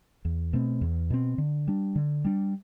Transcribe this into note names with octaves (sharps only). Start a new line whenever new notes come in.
E2
B2 A3 C4
E2
B2 A3 C4
D3
G3 D4
D3
G3 D4